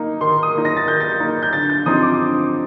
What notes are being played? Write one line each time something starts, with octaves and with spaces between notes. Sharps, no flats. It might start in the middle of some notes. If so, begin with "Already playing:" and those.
Already playing: A#3 D#4
D#3 C6
D#6
A#3 D#4
A#6
A6
D#3 G6
A6
A#3 D#4
G6
D3 A6
G6
F3 C4 D#4 D#6
D6
D3